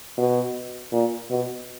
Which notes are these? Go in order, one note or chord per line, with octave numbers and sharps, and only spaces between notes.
B2
A#2
B2